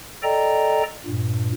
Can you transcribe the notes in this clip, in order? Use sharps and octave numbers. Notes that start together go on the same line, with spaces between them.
A4 D5 D#5 G5 A#5
G2 A#2